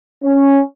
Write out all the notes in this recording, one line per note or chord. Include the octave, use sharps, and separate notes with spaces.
C#4